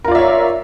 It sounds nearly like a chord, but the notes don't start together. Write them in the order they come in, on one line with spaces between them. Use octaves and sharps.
A#4 F4 D5 E5 C#5